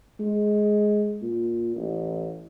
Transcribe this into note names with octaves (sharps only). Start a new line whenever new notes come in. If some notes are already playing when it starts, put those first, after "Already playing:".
G#3
A#2
A1